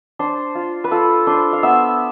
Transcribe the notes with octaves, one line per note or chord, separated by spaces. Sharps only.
D4 C5
F4
B4
F4 A4
D4 C5
F5
B3 E5